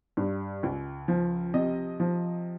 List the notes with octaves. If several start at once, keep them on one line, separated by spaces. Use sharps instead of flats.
G2
C#2
F3
C3 D#5
F3